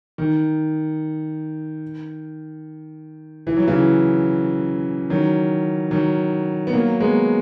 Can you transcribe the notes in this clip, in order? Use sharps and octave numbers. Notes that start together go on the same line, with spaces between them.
D#3
E3
F#3
C#3 E3
D#3 F#3
D#3 F#3
B3
F#3 A#3
G#3 B3